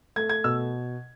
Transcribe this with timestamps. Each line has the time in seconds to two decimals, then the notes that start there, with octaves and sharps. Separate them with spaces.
0.16 A3 G#6
0.29 G#6
0.44 B2 E6